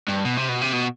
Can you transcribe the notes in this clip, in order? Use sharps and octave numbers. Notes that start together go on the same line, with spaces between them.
G2
B2
C3
B2
C3
B2